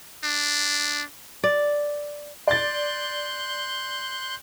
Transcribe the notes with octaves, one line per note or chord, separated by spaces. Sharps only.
D4
D5
D5 C6 F#6 G6 A6